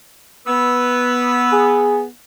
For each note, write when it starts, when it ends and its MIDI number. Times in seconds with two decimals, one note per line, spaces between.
0.47 2.08 59
0.47 1.92 71
0.47 1.92 88
1.52 2.03 68